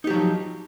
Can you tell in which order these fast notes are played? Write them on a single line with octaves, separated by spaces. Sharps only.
D#4 G4 F#3 F3